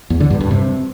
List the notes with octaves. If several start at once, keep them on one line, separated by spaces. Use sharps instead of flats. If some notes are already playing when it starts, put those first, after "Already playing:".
E2
D3
G2
G2
C3